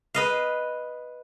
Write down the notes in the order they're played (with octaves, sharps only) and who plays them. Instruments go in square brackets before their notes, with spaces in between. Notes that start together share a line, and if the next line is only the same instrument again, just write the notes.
[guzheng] B4 D#5 F5